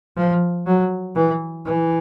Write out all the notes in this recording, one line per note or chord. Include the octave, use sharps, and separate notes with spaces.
F3
F#3
E3
E3